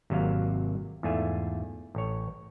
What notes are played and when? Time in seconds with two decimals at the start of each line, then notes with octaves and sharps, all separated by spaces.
0.10 G#1 C3 F#3 A#3 F5
1.03 E2 G#2 A3 F4 G#5
1.95 A1 C#5